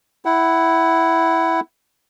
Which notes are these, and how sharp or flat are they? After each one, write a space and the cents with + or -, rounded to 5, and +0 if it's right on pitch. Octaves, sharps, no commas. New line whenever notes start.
E4 +0 F#5 +25